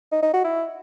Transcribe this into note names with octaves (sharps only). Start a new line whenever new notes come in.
D#4
D#4
F#4
E4